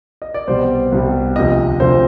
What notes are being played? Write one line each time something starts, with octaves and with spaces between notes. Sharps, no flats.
D#5
D5
C2 B2 G3 C5
C2 B2 G3
D2 C3 F3 D#5
D2 C3 F3 C5